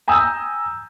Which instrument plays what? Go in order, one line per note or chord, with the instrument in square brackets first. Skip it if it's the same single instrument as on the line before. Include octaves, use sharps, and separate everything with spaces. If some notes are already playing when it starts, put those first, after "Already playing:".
[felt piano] G5 G#5 A#5 D#6 E6 G6